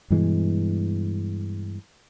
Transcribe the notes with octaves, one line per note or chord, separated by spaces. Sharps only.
G2 B2 E3 G#3